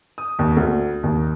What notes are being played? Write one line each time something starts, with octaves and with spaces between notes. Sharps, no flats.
D#6
D#2
D2
D#2